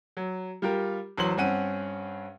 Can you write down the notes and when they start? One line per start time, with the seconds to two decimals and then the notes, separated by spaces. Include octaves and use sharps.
0.17 F#3
0.62 G3 F4 G4 A#4
1.18 A1 F#3 C5 C6 F#7
1.37 G2 C4 C#4 F#5 D#7